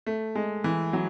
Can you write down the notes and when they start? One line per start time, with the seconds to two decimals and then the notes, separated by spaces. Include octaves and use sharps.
0.07 A3
0.35 G#3
0.64 E3
0.93 F#3